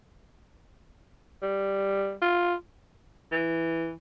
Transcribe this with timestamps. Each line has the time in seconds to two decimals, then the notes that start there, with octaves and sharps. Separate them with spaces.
1.42 G3
2.22 F4
3.32 E3